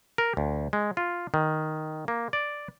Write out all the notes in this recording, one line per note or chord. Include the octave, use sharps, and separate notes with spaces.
A#4
D2
G#3
F4
D#3
A#3
D5